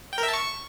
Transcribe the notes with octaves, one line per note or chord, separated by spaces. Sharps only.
G5
A#4
E5
A5
C#6